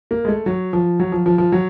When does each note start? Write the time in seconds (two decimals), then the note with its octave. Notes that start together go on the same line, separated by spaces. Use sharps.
0.11 A#3
0.25 G#3
0.28 A3
0.46 F#3
0.73 F3
1.00 F#3
1.12 F3
1.26 F3
1.38 F3
1.52 F#3